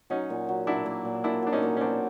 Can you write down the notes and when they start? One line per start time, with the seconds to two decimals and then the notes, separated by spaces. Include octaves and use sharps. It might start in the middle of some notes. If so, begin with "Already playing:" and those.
0.10 F#3 C#4 D#4
0.30 A#2
0.49 F#3
0.67 F#3 D4 E4
0.86 A#3
1.05 A#2
1.24 A#2 D4 E4
1.42 F#3 D4
1.52 C#4 D#4
1.63 A#2
1.77 C#4
1.81 F#3 C4 D4